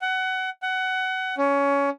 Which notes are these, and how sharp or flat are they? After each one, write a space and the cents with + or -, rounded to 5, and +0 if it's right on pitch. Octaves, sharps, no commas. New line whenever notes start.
F#5 +20
F#5 +20
C#4 +20